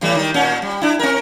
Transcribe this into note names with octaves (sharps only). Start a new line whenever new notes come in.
A2 E3 G3
D#3 G3
A#2 C#4
G3
D4 E4
C4 A#4